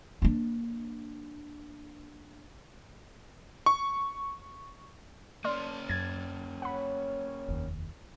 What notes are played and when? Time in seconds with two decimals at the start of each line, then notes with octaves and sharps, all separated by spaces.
0.22 A#3 D4
3.66 C#6
5.44 A#3 C#4 D5 C6 F6
5.89 F#2 G#6 A6
6.62 C#5 F#5 B5
7.48 F1 D#2